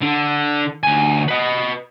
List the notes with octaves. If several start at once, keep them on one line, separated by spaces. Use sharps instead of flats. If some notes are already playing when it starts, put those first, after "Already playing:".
D3
D2 G#5
B4 D#5